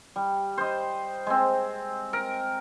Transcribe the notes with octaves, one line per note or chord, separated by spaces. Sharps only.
G3
C5 D#5
G#3 C4
A#4